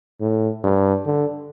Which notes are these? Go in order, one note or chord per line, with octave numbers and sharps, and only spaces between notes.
A2
G2
D3